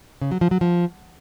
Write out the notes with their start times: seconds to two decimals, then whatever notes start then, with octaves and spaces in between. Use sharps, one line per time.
0.21 C#3
0.31 F#3
0.41 F3
0.51 F#3
0.61 F3